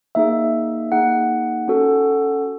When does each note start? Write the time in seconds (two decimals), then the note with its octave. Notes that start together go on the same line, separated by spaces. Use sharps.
0.15 A#3 D#4 G#4 E5
0.92 A#3 D#4 G#4 F#5
1.68 C#4 F#4 A4